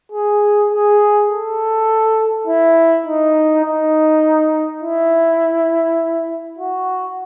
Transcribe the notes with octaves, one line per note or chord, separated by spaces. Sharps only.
G#4
G#4
A4
E4
D#4
D#4
E4
F#4